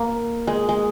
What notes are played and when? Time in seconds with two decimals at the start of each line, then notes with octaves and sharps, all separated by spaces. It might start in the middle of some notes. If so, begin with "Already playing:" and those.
Already playing: A#3
0.47 G#3
0.69 G#3